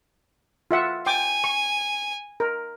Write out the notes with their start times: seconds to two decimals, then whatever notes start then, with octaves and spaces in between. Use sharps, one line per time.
0.71 F4 E5 F#5
1.07 G5 G#5 D6
1.44 C#6
2.40 A#4